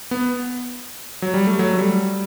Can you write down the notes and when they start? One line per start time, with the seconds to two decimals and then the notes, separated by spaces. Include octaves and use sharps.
0.11 B3
1.22 F#3
1.34 G3
1.47 A3
1.59 F#3
1.74 A3
1.78 G3